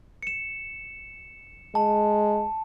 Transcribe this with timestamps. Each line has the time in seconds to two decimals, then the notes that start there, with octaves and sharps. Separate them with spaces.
0.23 C#7 E7
1.75 G#3 A5